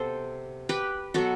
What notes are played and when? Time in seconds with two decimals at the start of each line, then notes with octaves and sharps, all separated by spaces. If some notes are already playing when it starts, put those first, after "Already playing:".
Already playing: C3 B3 A4 C5
0.69 G4 B4
1.14 B2 F#3 B3 F#4 A4